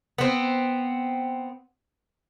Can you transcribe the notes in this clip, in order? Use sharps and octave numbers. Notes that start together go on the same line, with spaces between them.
B3 C4